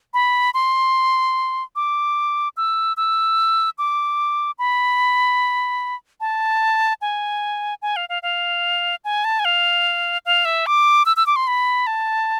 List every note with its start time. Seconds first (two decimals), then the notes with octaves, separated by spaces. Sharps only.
0.14 B5
0.54 C6
1.76 D6
2.57 E6
2.97 E6
3.78 D6
4.59 B5
6.21 A5
7.01 G#5
7.82 G#5
7.96 F5
8.09 F5
8.23 F5
9.05 G#5
9.24 A5
9.39 G#5
9.45 F5
10.26 F5
10.45 E5
10.66 D6
11.06 E6
11.17 E6
11.27 D6
11.36 C6
11.47 B5
11.87 A5